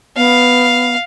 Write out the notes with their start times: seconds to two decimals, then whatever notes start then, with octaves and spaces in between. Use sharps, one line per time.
0.16 B3 F5